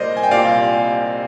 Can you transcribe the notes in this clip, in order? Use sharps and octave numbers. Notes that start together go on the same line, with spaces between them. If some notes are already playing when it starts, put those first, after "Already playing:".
Already playing: C2 A#2 G3 A#4 C5 D5 D#5
G#5
G5
C2 A#2 G3 D5 F5